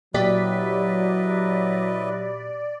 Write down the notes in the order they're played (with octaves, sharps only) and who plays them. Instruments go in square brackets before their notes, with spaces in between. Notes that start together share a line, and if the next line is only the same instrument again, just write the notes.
[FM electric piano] A#2 G4 B6 [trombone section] F#3 [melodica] E4 B4 D#5 [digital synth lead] D5